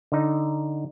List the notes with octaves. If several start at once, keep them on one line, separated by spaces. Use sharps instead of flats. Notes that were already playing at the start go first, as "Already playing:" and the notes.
D3 D#4